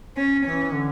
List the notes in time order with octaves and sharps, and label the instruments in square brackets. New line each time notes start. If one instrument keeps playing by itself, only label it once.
[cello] C#4
[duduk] E3 [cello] C#4
[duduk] D3